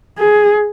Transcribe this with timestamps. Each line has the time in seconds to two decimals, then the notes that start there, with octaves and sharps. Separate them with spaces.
0.19 G#4